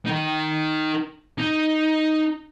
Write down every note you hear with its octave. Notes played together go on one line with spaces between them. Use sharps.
D#4 A#4
D#4